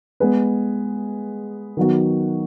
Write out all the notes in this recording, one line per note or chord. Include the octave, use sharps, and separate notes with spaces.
G#3 B3 G#4 B4
D#3 F#3 B3 F#4